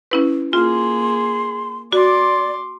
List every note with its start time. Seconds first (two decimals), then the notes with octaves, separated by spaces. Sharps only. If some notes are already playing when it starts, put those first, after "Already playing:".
0.11 C#4 E4 B4
0.53 A#3 F4 G#4 C6
1.93 F#4 D5 C6 D6